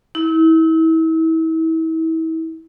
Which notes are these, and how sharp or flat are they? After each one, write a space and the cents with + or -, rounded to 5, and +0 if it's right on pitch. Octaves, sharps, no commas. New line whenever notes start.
E4 -35